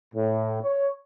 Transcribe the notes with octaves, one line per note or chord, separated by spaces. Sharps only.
A2
C#5